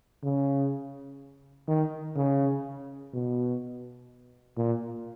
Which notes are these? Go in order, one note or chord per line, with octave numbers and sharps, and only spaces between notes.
C#3
D#3
C#3
B2
A#2